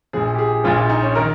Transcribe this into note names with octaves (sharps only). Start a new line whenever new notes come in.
A#1 A#2 F3 G#4
G4
G#4
A#1 A#2 F3 F4
F4
D#4
C#4
D#3 A#4